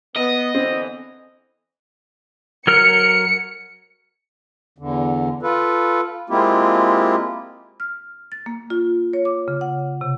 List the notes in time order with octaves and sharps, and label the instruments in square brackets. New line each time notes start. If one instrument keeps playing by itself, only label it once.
[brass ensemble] B3 [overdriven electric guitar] D#5
[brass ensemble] D3 E3 B3 [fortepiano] C4
[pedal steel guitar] F#3 A#4 F6 [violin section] C#7
[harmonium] E2 D3
F4 A4 B4
G#3 A#3 C4 E4 F4 G4
[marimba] F6
A6
A#3
F4
C#5
D6
C#3
F#5
C3